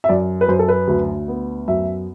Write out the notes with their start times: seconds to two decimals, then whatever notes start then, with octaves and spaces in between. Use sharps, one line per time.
0.04 E5
0.09 F#2 D5
0.41 B4
0.48 F#2 C5
0.59 A4
0.68 B4
0.88 D2
1.28 B3
1.68 F#2 E5